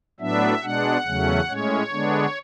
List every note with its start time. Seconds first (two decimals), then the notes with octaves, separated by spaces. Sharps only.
0.20 A2 F#3 B3 D4 E5
0.63 B2 G#3 D4 F#5
1.06 E2 C#3 F#3 A3 C#4
1.48 A2 G#3 C#4 C#5
1.92 D3 G#3 B3 D4